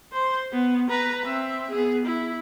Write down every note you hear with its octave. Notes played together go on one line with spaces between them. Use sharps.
C5 C6
B3
B4 A#5
C4 E5
B3 G#4
E4